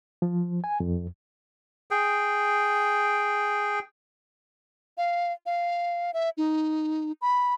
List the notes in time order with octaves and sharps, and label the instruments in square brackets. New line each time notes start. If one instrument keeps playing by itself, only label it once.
[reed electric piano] F3
G#5
F2
[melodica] G#4 G5
[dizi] F5
F5
E5
D#4
B5